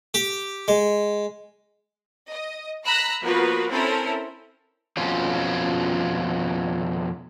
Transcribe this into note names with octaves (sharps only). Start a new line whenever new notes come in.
G4
G#3
D#5
A#5 B5 E6 F#6 A#6
F3 A#3 B3 F#4 A#4 B4
C4 C#4 E4 A4 A#4 C5
F2 B2 C#4 F4